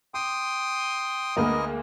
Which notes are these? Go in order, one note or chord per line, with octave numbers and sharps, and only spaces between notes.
G5 C6 D6 D#6
D2 G#3 A#3 B3 A#4 D#5